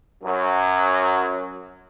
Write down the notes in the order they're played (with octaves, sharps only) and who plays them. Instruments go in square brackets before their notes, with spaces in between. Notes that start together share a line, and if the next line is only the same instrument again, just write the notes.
[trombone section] F#2 F#3